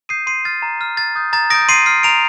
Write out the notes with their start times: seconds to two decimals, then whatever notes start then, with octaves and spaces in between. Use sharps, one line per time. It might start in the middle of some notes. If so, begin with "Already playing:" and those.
0.09 D#6 G6 C7 D#7
0.27 C6 C7 D#7
0.45 F6 A6
0.62 A#5
0.81 F6
0.97 A#5 A6
1.16 D#6 G6
1.33 A#5 A6
1.50 D#6 G6 A#6 D7
1.69 C6 C7 D#7
1.86 F6 C7 D#7
2.03 A#5 D7 F7